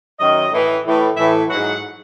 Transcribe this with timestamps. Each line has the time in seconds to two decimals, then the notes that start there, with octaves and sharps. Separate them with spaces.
0.20 F#2 D#3 F#3 D#5
0.52 A2 E3
0.85 A2 E3
1.17 A2 E3 E5
1.49 G#2 F#3 F#5